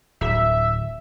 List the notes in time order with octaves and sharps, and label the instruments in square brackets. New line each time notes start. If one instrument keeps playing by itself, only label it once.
[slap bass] D1 [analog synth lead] E5